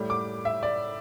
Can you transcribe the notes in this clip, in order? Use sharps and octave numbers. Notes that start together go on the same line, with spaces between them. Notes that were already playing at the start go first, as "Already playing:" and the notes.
Already playing: A2 G3
D6
E5
D5